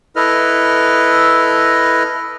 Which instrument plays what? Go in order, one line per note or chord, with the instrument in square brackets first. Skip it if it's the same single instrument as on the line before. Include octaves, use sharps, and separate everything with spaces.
[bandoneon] E4 A4 B4 D#5 F6